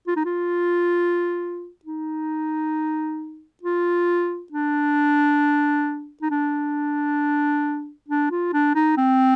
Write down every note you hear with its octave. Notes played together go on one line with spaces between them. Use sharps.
F4
D#4
F4
D#4
F4
D4
D#4
D4
D4
F4
D4
D#4
C4